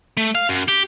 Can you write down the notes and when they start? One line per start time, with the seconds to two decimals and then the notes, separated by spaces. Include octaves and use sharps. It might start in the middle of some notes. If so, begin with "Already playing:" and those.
0.17 A3
0.35 F5
0.49 F#2
0.68 G4